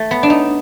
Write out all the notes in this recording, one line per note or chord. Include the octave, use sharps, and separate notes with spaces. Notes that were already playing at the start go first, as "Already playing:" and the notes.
Already playing: A3
B3
D4
D#4